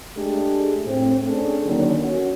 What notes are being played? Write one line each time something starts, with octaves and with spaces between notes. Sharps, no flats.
G#3 A3 D4 G4 G#4
A2 C4
C#4 D4 G#4 A4
D3 D#3 F#3 A#3 C#4 D4
C#4 F#4